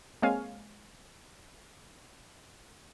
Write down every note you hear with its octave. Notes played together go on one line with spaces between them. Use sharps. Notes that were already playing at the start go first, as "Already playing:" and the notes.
G#3 A#3 C4 C#5 F5 G#5